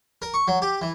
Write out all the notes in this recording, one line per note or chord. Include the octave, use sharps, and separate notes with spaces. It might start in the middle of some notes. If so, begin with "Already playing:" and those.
A#4
C#6
F#3
G4
E3